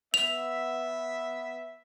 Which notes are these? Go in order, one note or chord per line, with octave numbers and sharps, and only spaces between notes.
B3 E5 F7